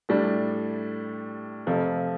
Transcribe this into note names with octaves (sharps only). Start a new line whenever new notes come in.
A2 G3 D4
F2 C3 F3 A3